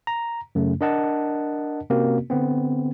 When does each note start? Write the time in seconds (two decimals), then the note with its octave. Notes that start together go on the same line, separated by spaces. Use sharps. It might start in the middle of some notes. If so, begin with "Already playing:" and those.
0.07 A#5
0.55 F#2 C#3 A3
0.81 D4 A#4 D#5 F#5 A5
1.90 C3 A#3 C4 C#4 F#4 A#4
2.30 D3 B3 C4